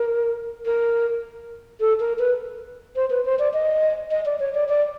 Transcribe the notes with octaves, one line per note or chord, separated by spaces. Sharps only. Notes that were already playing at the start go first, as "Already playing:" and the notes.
Already playing: A#4
A#4
A4
A#4
B4
C5
B4
C5
D5
D#5
D#5
D5
C#5
D5
D5